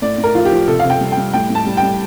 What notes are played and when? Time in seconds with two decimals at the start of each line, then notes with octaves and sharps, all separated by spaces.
0.02 A2 D5
0.18 A2
0.24 A#4
0.35 F3 F4
0.45 G4
0.51 F3
0.68 C3 A4
0.80 C3 F5
0.90 G5
1.01 G3
1.12 G5
1.17 G3
1.33 A2 G5
1.50 A2
1.55 A5
1.66 G3
1.77 G5
1.83 G3